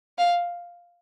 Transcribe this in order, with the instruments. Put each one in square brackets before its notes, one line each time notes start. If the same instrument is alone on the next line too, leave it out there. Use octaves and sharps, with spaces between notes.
[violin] F5